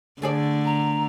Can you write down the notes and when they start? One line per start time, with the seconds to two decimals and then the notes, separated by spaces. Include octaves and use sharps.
0.22 D3 A3 G#4 D5
0.65 A#5